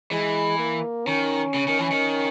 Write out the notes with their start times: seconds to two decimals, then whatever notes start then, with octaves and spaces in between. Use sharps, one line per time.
0.11 E3 G#3
0.59 A#3
1.07 D#3 C#4
1.54 C#3
1.67 D#3
1.78 E3
1.91 D#3